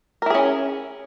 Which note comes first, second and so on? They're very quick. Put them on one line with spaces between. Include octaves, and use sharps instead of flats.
A#4 E4 G#4 C#4